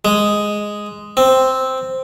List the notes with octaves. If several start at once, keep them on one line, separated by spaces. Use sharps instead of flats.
G#3
C4